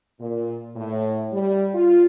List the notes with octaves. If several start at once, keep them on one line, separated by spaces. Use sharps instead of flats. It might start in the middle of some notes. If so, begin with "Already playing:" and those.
A#2
A2
G3
F4